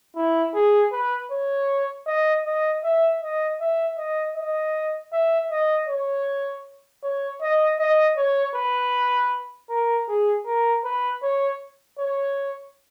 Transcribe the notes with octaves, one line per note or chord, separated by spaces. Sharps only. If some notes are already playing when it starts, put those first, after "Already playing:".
E4
G#4
B4
C#5
D#5
D#5
E5
D#5
E5
D#5
D#5
E5
D#5
C#5
C#5
D#5
D#5
C#5
B4
A#4
G#4
A#4
B4
C#5
C#5